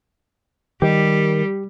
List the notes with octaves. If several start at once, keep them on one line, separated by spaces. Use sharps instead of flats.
D#3 G3 G4